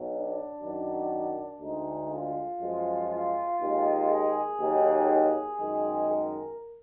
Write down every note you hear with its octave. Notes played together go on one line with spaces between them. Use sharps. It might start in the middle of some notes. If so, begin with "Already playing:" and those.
Already playing: B1 B2 F#3
D4
F#2 D#3 F#3
D2 D3 G#3 D#4
F4
F#2 F3 G#3
F4
D#2 D#3 G#3
G#4
D#2 D#3 F#3
G#4
F#2 D#3 G#3
A#4